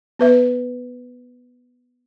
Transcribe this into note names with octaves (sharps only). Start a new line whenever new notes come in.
B3 B4 E5